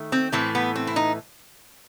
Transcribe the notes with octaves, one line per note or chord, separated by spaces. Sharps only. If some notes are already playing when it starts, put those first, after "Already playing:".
Already playing: D#3 A3
C4
A2 E3 A3 C4
B3
C4
E4
D#4